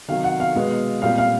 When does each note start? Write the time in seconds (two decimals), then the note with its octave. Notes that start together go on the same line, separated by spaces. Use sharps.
0.08 C3 D#3 F#3 F5
0.24 F#5
0.40 F5
0.55 B2 G#3 B3
1.02 A#2 G3 C4 F5
1.18 F5